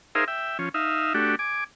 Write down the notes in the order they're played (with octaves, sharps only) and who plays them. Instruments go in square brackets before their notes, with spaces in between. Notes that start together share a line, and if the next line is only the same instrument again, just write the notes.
[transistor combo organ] D#4 G#4 A#4 C5 E5 F5
E5 G5
F3 C#4
D#4 E5 F5
A3 D4 F#4 G4
G#5 D6